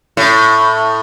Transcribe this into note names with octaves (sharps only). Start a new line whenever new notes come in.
A2